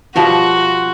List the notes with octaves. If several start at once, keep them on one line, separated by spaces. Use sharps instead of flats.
B2 F3 G3 F4 F#4